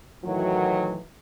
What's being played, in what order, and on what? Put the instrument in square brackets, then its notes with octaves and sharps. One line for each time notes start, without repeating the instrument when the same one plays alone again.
[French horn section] A2 D#3 E3 F#3